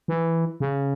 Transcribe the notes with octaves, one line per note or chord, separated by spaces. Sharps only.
E3
C#3